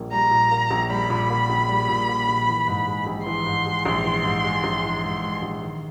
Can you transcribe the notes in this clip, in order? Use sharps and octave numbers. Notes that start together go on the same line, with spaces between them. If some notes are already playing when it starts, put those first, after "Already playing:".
Already playing: A#1 A#2 G3 A#3
G3 A#5
A#2
A#3
A#1
G3 B5
A#2
A#3
A#1
G3
A#2
A#3
A#1
E3
G#2
G#3
A#1
E3 C6
G#2
G#3
A#1
E3
G#2
G#3
A#1
E3
G#2
G#3
A#1
D#3